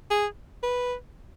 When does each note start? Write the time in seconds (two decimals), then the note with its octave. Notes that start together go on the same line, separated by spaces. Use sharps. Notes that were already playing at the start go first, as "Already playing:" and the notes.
0.11 G#4
0.63 B4